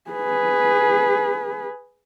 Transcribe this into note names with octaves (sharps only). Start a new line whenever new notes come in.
G#4 B4